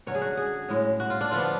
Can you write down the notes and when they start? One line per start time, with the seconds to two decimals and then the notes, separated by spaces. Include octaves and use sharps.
0.07 D3 F#3 C#4 C#5
0.15 G#4
0.21 F#4
0.37 G#4
0.69 A2 G#3 C#4
1.00 F#4
1.10 F4
1.21 D4
1.31 D3 F3 B3 F4